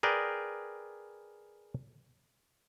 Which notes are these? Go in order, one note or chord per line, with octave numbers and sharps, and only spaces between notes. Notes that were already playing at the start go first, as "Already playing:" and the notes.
G#4 A#4 B4 D5 G5